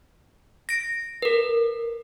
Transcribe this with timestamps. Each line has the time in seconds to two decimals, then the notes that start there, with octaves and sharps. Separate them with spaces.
0.69 A#6 D7
1.22 A#4 B4